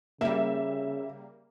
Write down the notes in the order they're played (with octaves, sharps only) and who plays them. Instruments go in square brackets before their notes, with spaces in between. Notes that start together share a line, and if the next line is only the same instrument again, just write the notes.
[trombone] C#3 [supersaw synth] G3 A#3 [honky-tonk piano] E5